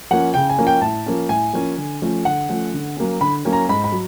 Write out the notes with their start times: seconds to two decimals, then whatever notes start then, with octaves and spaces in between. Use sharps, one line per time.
0.11 F3 A#3 C#4 F#5
0.34 C#3 G5
0.50 G#5
0.58 F3 A#3 C#4
0.67 G5
0.81 A2 A5
1.06 F3 A#3 C#4
1.29 A2 G#5
1.53 F3 A#3 C#4
1.78 D3
2.02 F3 A3 C#4
2.25 D3 F#5
2.49 F3 A3 C#4
2.74 D3
2.97 F#3 A#3 C#4
3.21 D3 B5
3.45 F#3 A#3 C#4
3.53 A#5
3.69 G#2 B5
3.84 B5
3.92 F#3